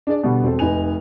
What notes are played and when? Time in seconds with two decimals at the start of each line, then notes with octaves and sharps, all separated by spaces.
0.07 D4 G#4 D5
0.23 B2 D3 G3 B3
0.43 E1 C4 A4
0.59 F1 D#4 B4 G#5 F7